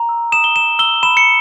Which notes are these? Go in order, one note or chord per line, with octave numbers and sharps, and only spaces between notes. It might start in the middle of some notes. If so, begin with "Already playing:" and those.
Already playing: A#5
E6
D#6 E7
G7
D#6 E7
E6 G7
B5 E7
C#7